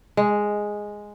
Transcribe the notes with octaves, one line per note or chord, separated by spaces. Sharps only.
G#3